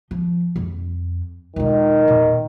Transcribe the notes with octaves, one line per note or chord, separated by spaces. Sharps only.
F3
F2
E1 D#3 F4
E2 A#2